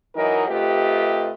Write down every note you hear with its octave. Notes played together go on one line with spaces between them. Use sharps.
E3 F#3 D#4 A#4 D#5
C3 A3 F4 G4 B4 D#5